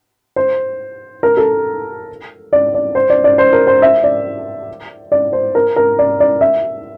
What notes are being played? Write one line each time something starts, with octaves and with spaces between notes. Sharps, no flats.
C5
A#4
A4
D5
D5
C5
D5
D5
C5
A#4
C5
E5
D5
D5
C5
A#4
A#4
D5
D5
E5